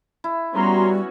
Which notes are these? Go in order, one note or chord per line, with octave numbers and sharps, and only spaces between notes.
E4
G3 B3 C#4 F#4 A#5 C6